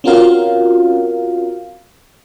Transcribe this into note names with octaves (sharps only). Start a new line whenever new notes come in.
C4 C#4 F4 F#4 A#4 F5